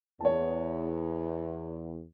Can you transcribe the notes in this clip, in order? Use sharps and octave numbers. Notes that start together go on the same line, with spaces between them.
E2 C#5 A5